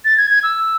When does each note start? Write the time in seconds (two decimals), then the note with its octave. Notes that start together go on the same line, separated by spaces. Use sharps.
0.05 A6
0.17 G#6
0.30 G#6
0.43 E6